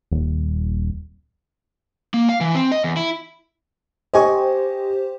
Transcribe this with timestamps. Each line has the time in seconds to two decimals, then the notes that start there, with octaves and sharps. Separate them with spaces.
0.12 D#1
2.14 A#3
2.29 F5
2.41 E3
2.55 C4
2.72 D#5
2.84 E2
2.97 E4
4.14 G4 C5 D#5 G#5 C#6